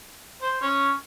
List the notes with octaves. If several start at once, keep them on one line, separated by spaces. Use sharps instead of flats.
C5
C#4